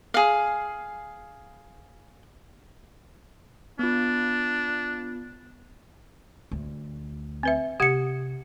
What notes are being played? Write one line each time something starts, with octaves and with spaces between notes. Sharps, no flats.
G#4 F5
B3 D4 F4
D2 A3
C4 B4 E5
C3 G4 F#5 G#6 C#7